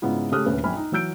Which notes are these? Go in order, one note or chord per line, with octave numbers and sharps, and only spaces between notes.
G#2 C#3 B3 E4 F4
C#3 A3 G4 D#6 F6 F#6
D#1 D2 C#3 B4
A#1 F#2 G#5 B5 F6
D#4
E3 F#3 E6 G6 D7